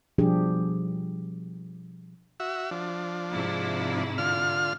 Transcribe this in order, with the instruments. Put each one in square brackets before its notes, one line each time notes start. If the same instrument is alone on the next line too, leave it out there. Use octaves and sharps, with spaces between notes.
[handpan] B2 F3 G3 D4 G4 G#4
[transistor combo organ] F#4 E5
F3 D4
[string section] G#2 C3 E4
[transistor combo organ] D3 F4 F6